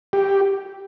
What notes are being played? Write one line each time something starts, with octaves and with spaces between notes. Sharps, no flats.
G4